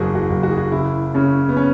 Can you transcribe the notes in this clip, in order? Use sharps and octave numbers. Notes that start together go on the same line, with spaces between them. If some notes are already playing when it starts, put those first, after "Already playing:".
Already playing: F#1 E2 F#4 G#4
F#4
F#1
F#4
G#4
F#4
C#3 E4
C#3 C#4
B3
C#4